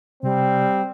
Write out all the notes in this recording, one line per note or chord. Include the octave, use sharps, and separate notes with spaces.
C3 G3 C4